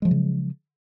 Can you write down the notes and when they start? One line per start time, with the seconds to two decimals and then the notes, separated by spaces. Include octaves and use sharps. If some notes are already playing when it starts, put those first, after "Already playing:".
0.02 G#3
0.05 F3
0.08 F#3
0.11 C#3